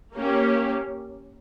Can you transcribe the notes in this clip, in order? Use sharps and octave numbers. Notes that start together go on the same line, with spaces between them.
A#3 C#4 G4